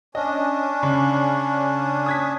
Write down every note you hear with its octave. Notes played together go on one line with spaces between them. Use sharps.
C#4 D4 D#5
C#3
D#6 G#6 B6